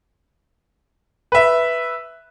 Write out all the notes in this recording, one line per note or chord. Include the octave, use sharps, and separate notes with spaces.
B4 E5